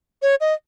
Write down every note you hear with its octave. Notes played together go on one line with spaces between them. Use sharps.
C#5
D#5